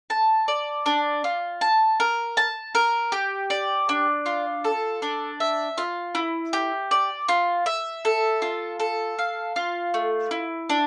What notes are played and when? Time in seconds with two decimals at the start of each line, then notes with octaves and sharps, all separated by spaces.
0.10 A5
0.48 D5
0.86 D4
1.24 F4
1.61 A5
2.00 A#4
2.37 A5
2.75 A#4
3.12 G4
3.50 D5
3.89 D4
4.26 F4
4.64 A4
5.02 D4
5.40 E5
5.78 F4
6.15 E4
6.53 G4
6.91 D5
7.28 F4
7.66 E5
8.05 A4
8.42 F4
8.80 A4
9.19 F5
9.56 F4
9.94 A3
10.31 E4
10.70 D4